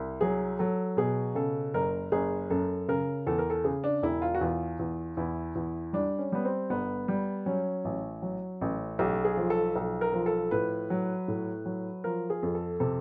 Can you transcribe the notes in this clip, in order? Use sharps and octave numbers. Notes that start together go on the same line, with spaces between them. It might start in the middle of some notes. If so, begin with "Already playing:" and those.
Already playing: C2
F#3 G#4
F#3 A4
B2 G#4
C#3 A4
F#1 A#4
F#1 G#4
F#2 A4
C#3 A#4
E2 A4
A#4
A4
C#3 G#4
D4
E1 E4
F4
F#4
E2 F4
E2
E2 E4
E2
G3 D4
C#4
G3 B3
C4
G1 B3
G3
F#3 C#4
A1
F#3
A1
B1 G4
G#4
F3
A4
B1
A#4
F3
A4
A2 B4
F#3
A2
F#3
F3 A#4
G#4
F2
A4
C3 A4